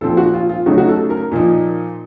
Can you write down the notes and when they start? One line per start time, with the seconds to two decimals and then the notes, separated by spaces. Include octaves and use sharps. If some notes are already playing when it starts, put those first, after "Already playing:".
0.01 A#2 F3 C4 A4
0.17 F#4
0.34 F4
0.49 F4
0.66 C#3 F#3 A3 D#4 F#4
0.78 F#4
0.89 A4
1.10 A#4
1.31 A#2 F3 A#3 D#4